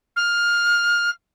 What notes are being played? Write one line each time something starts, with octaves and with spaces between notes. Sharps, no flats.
F6